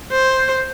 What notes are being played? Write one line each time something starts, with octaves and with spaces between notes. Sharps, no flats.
C5